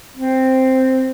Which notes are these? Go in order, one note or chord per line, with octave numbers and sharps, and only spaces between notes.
C4